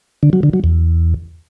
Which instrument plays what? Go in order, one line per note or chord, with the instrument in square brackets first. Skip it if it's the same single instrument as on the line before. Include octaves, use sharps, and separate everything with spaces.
[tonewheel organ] D3
F#3
D3
F#3
E2